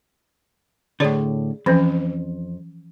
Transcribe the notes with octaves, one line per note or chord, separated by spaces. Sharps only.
A2 D3 G#4 C#5 D5
F2 E3 F3 C#4